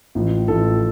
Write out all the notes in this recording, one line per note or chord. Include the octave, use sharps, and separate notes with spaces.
A1 A2 F3
A1 A2 F3 A4